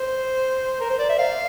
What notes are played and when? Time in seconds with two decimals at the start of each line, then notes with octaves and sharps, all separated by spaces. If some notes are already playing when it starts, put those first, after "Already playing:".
Already playing: C5
0.81 A#4
0.90 C5
0.99 D5
1.09 E5
1.19 F5